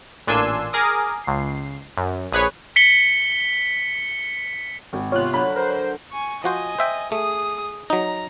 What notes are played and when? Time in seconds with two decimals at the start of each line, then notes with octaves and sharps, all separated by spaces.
0.27 A1 A#2 D4 G#5 C6 E6
0.73 G#4 A#4 D6 D#6
1.24 C#2 C7
1.97 F#2
2.32 A#1 G#4 B4 C#5
2.76 B6 C#7 G7
4.93 G#1
5.12 C3 B3 F4 C#5 F5 F#6
5.33 D3 F#3 B5
5.55 A#4 C5
6.12 G#5 C#6
6.44 F3 F#4 C5 D#5 G#5
6.78 C5 E5 G5
7.12 A3 G#4 D#6
7.90 F#3 D#4 A#5